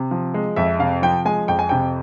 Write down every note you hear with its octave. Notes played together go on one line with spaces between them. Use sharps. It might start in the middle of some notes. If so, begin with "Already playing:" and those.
Already playing: C3
F3
G#3
F2 E5
C3 F5
F3 G5
G#3 G#5
F2 G5
G#5
C3 G5